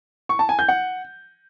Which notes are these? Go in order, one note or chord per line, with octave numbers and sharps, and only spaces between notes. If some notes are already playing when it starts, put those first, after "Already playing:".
C#6
A5
G#5
G6
F#5